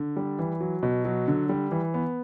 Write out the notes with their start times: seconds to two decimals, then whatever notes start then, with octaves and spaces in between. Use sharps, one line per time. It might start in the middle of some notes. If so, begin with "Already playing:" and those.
Already playing: D3
0.16 G3
0.39 E3
0.61 F#3
0.83 B2
1.05 F#3
1.28 D3
1.49 G3
1.71 E3
1.94 B3